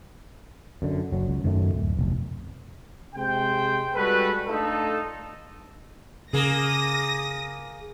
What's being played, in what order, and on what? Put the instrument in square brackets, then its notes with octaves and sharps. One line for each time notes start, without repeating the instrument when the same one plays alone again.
[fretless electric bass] F#2 D3
F#1 F#3
C#2
F#2 D#3 F#3 A3
D1
F1 B1
[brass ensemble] C3 G#3 C5 G5
G3 G#3 F#4 A4 B4
A3 D4 D#4 F4 A4
[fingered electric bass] C#3 [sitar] A#3 G#4 [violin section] D#6 A#6